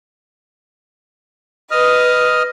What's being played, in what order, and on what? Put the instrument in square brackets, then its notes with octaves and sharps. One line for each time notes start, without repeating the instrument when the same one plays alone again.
[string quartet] B4 [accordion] D#5 D#6 F6